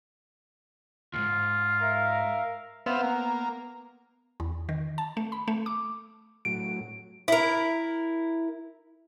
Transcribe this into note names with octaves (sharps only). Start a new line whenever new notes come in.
D#2 G#2 F4
A#4 E5 F5
B3 C4 E5 F5
A#3
E2
D#3
A5
A3
B5
A3
D6
A2 F#3 D7
E4 A#4